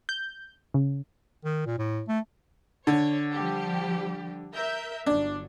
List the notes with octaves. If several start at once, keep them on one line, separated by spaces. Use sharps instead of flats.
G6
C#3
D#3
A#2
A2
A3
D3 C#5
F3 G3 G4
A#4 E5 G6
G1 F#3 D4